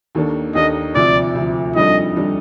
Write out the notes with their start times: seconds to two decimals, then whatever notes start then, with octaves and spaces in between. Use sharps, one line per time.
0.15 D#2 D#3 A#3 D4 A4
0.55 D#2 D#3 A#3 D4 A4 D#5
0.95 D2 C3 F3 D5
1.35 D2 C3 F3
1.76 F2 D#3 G3 D4 A4 D#5
2.16 D#3 G3 D4 A4